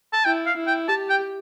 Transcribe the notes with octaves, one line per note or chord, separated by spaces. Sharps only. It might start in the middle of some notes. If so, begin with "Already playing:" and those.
A5
E4 G5
F5
E4
G5
G4 A5
G5